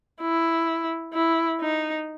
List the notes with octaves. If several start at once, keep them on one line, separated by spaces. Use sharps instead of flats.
E4
E4
D#4